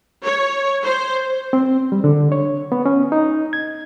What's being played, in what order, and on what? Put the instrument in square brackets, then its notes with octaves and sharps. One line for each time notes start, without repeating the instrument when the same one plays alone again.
[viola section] C#5
C5
[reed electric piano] C4
G3
D3
C#5
B3
C#4
D#4
G#6